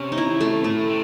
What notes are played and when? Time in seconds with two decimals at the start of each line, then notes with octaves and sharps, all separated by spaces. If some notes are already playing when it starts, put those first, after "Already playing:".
Already playing: C3 C#4
0.12 D#4
0.18 E4
0.41 A3
0.64 A2 A3
0.88 C3